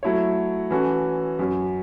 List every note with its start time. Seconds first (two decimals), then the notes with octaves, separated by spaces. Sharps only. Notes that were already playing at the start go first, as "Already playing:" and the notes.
0.03 F#3 A3 E4 C#5
0.71 E3 C#4 F#4 A4
1.39 F#2 F#3 C#4